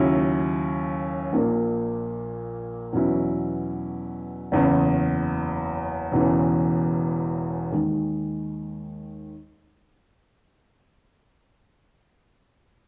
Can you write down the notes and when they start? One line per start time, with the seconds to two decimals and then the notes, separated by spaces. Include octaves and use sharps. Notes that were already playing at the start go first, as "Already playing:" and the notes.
Already playing: D#2 C#3 F#3 C#4 E4
1.33 A#1 A#2 A#3
2.93 E2 B2 F#3 C#4 E4
4.52 F#1 E2 C#3
6.12 E1 E2 C#3 E3
7.72 D#2 D#3 G#3